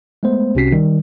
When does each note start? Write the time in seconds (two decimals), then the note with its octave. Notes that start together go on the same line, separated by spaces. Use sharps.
0.23 G#3 A3 B3 C5
0.55 C2 C3 C#4 F#4 B6 C7
0.72 D#3 G3